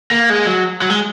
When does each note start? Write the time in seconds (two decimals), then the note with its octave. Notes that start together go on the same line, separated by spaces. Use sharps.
0.11 A#3
0.30 G#3
0.46 F#3
0.82 F#3
0.90 G#3